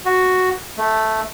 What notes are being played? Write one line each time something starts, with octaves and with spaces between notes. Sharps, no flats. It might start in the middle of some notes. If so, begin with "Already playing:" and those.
F#4
A3